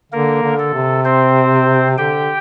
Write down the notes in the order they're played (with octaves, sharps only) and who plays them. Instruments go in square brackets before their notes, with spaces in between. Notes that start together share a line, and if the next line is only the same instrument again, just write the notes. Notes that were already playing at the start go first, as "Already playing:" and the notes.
[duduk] D3 [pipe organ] A#3 A#4
[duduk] D3
[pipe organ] A4
[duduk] C3
[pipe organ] C4 C5
[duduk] D3 [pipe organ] G4 G5